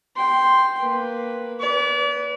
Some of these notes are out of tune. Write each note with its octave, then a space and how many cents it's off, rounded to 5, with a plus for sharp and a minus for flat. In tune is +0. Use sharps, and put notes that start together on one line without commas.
G5 +0 C6 +0
A#3 +0 B4 +0
B4 +0 D5 -40